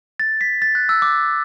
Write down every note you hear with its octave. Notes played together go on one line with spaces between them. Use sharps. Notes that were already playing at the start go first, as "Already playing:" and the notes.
A6
B6
A6
F#6
E6
D6